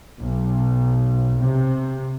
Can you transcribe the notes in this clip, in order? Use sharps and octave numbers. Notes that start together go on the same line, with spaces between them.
B1
C3